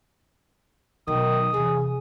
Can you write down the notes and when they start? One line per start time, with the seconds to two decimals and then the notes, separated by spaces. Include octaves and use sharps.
1.08 B2 D#3 F#3 D#6
1.54 E2 C3 G#4